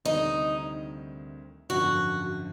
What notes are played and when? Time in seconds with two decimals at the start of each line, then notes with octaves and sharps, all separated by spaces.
0.05 D2 C3 D#3 G3 C4 D#4
1.69 G#1 F#2 D3 F3 F#4